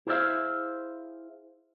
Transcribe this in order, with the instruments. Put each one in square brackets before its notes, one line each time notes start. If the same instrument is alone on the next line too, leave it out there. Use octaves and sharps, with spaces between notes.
[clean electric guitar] E4 G#4 C5 D5 E5 F5